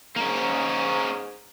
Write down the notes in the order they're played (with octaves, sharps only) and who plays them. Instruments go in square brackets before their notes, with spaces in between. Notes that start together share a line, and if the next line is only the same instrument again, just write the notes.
[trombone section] G#2 [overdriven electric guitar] A#3 C#4 [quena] A#5